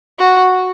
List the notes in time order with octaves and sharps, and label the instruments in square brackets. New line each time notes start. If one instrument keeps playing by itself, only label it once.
[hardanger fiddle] F#4